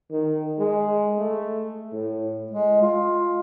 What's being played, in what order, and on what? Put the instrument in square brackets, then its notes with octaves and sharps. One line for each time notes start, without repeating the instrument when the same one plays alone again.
[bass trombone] D#3
G#3
A3
A2
[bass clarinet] G#3
F4